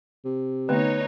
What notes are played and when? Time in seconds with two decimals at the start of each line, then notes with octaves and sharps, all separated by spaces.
0.25 C3
0.69 D3 A3 B3 D#4 B4 C#5